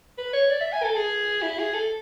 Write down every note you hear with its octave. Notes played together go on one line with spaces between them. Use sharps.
B4
C#5
D5
E5
G#5
A4
G#4
E4
G#4
A4